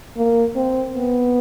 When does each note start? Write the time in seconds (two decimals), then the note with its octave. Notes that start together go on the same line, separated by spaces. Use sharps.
0.17 A#3
0.56 C4
0.95 B3